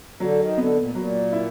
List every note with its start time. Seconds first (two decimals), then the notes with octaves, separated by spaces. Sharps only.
0.20 D3 F#3
0.39 D#3
0.57 D3 B3
0.77 A#2
0.95 A#2 F#3
1.32 E4